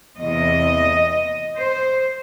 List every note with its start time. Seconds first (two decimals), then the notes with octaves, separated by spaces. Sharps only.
0.18 E2 C3 E3 D#5
1.55 C5